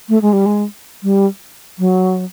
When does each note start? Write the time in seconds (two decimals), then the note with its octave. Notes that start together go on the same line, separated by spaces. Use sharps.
0.09 A3
0.22 G#3
0.33 G3
0.46 G#3
1.03 G3
1.79 F#3